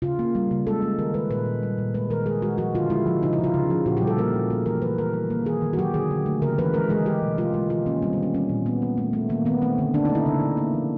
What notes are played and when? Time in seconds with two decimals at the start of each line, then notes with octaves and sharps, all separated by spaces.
0.02 C#3 F4
0.19 A#3
0.35 G3
0.51 C#3
0.67 G#3 A4
0.82 G#3
0.98 D#3 A#4
1.14 G#3 B4
1.30 A#2 B4
1.46 A#2
1.63 G3
1.78 A#2
1.94 G#3 B4
2.10 D#3 A#4
2.26 G#3 G#4
2.42 G#3 F#4
2.58 F3 F#4
2.75 D3 F4
2.90 G#3 E4
3.06 F3
3.22 C#3 D#4
3.33 E4
3.38 C#3
3.44 F4
3.54 C#3
3.70 F3
3.86 A#2 F#4
3.97 G4
4.02 G3
4.07 A4
4.18 A#3 A#4
4.34 A#2
4.50 A3 G#4
4.66 E3 A#4
4.82 E3 B4
4.98 E3 A#4
5.13 G3
5.30 A#3
5.45 D#3 G#4
5.62 D#3
5.73 F#4
5.78 F#3 G4
5.94 D3 G#4
6.11 D3
6.26 A3
6.42 C#3 A#4
6.58 E3 B4
6.73 G#3 A#4
6.89 G#3 G#4
7.05 G#3 G4
7.22 B2
7.38 G#3 F4
7.54 G#3
7.69 D#3 F4
7.86 A#3 C#4
8.02 G3 C4
8.13 D#3 B3
8.23 C#4
8.34 G3 C#4
8.49 A#2
8.66 A#2 B3
8.82 A#3
8.98 A3
9.13 A3
9.29 D#3 A#3
9.45 D#3 B3
9.62 A3 C4
9.78 D3
9.94 D3 D4
10.05 A3 D#4
10.15 E4
10.26 C#3
10.41 C#3
10.57 A#3
10.74 F3